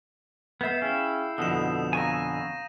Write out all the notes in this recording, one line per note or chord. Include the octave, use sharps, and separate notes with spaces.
B3 E5 G6 C7
C#4 E4 G#4 F5 G5
F2 B2 D3 A4 D#6 E7
F5 G#5 A#5 C#6 E6 A#6 D#7